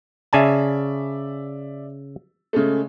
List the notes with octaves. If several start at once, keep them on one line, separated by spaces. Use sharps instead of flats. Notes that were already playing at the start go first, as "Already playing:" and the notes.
C#3 D5 E5 G#5 A5
C#3 G#3 A3